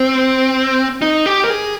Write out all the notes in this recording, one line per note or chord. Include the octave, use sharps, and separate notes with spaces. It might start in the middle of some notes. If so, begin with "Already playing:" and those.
Already playing: C4
D#4
G4
A#4
G#4